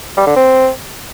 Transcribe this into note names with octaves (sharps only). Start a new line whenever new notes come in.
G3
D3
C4